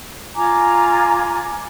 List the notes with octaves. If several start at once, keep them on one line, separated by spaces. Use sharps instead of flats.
F4 G#5 A#5 D6